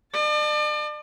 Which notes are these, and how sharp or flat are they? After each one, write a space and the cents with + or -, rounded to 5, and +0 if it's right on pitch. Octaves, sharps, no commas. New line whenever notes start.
D5 +40 A5 +0